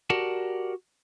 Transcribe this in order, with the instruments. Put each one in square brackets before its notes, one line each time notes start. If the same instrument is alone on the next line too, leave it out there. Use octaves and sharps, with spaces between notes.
[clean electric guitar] F#4 G4 A#4 D5 F#5 A5